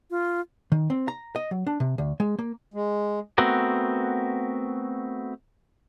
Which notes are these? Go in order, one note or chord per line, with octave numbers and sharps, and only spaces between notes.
F4
D#3
C4
A#5
D#5
F#3
D4
C3
D2
G#3
A#3
G#3
A3 B3 C4 F#4 A#4